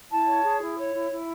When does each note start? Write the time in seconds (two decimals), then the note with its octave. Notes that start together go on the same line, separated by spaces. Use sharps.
0.09 E4 A5
0.27 C#5
0.43 G#4
0.60 E4
0.77 C#5
0.94 E4
1.11 E4